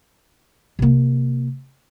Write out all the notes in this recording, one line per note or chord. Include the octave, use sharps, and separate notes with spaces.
C3 A#3